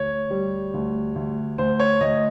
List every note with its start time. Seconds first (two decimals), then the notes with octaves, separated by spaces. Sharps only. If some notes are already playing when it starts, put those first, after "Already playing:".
Already playing: D2 C#5
0.31 G3
0.74 D2
1.16 D2
1.58 D2 C5
1.80 C#5
2.01 D2 D#5